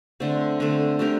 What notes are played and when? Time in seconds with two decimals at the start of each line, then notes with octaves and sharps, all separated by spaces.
0.20 D3 A3 C4
0.60 D3 A3 C4
0.99 A3 D4 G4 A#4